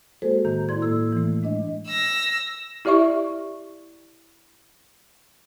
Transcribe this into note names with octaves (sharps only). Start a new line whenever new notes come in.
G#3 A#3 F#4 G#4 A4 C5
A2 D#3 A#5 G6
G2 E4 D5 C6 G#6
A2 A#3 A4 E6
E3 A3
G#3 D4 D#5
E6 A#6
E4 G4 D5 E5 C#6